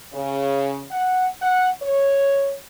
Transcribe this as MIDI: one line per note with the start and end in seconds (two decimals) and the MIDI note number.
0.13 0.83 49
0.91 1.27 78
1.42 1.68 78
1.82 2.54 73